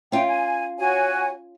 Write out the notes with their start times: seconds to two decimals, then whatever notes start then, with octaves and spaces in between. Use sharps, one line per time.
0.12 C#4 F4 E5 G5
0.29 G#5
0.79 F#4 C#5 G#5